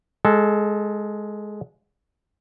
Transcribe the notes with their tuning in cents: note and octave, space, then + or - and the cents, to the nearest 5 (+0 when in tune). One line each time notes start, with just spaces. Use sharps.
G#3 +5 A4 -10